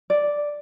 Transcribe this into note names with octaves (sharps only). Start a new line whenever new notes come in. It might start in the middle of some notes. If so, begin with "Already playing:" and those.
D5